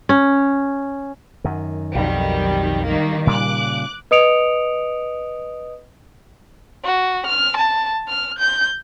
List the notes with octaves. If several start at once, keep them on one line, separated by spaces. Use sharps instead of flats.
C#4
F#2 D#3
B1 F2 D#3 F#3 G3
D#3 G3 A#3
A#2 C#3 G3 D6 F#6
B4 D#5 D#6 C#7 D7 F7
F#4
F6
A5
F6
G6